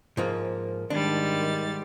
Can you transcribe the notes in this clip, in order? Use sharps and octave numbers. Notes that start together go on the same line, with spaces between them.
G#2 F3 A#3
G#2 D#3 G3 D4 A6